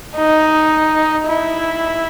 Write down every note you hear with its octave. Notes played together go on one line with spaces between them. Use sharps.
D#4
E4